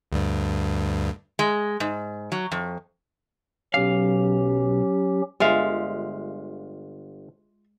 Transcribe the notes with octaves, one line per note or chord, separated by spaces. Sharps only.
D2 G2
G#3
G#2
F#3
F2
B1 F#3 C#4 G4 F5
G1 G#3 F4 E5 F5